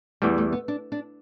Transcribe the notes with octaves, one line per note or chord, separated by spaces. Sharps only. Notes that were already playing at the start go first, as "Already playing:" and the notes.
E2 E3 G3 A3
A3
B3
D4
D4